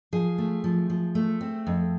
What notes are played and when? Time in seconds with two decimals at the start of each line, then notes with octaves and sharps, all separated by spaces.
0.13 F3 G#4
0.38 A3
0.64 F3
0.90 F3
1.15 A3
1.41 C4
1.67 F2